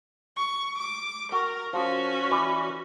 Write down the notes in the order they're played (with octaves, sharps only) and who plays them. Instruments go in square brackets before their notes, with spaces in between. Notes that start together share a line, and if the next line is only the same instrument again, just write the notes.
[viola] C#6
D6
[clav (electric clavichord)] F#4 [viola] A#4
[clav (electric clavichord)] F3 [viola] C#4 F#4
[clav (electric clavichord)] E3 D5